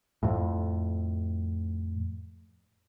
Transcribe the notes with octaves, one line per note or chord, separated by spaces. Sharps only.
F2 A2